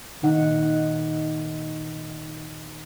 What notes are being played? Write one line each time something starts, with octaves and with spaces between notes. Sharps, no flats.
A#2 D#3 D#4 F#5